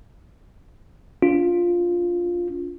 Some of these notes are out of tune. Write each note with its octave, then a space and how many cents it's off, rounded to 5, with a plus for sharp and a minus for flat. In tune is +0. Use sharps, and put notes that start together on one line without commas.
D4 -40 F4 +0